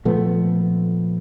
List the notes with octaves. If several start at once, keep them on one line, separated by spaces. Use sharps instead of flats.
A#2 F3 A3 B3